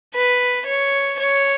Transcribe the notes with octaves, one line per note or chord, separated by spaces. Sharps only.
B4
C#5
C#5